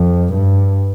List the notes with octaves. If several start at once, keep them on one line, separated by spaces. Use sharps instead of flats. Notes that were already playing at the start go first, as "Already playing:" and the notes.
Already playing: F2
G2